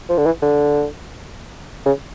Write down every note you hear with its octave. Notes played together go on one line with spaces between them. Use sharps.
F3
D3
E3
D3
C#3